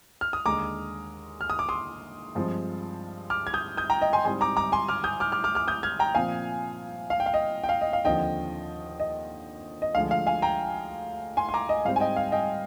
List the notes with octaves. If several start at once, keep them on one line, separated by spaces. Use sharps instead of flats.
F6
D#6
D#2 D3 G#3 A#5 D6
F6
D#6
D6
C6 D#6
G2 F3 G#3 C4
D6 F6
G#6
D#6 G6
D#6 G6
G5 A#5
D#5 G5
G#5 C6
G#2 G3 C4 G#5 C6
A#5 D6
A#5 D6
G#5 C6
D6 F6
D#6 G6
D6 F6
D6 F6
D6 F6
D6 F6
D#6 G6
F6 G#6
G5 A#5
A#2 F3 C4 F5 G#5
F5
G5
F5
D#5
G5
F5
D#5
F5
D#2 D3 F3 C4 D#5 G5
D#5
D#5
D2 D3 F3 G#3 F5
F5
F5 G#5
G5 A#5
G#5 C6
C6
A#5 D6
D#5
G#2 G3 C4 F5
G#5
D#5 G5
F5
D#5 G5